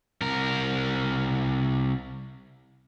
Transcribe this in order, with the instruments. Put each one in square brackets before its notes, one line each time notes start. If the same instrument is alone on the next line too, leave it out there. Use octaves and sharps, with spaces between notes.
[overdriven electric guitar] C2 A#4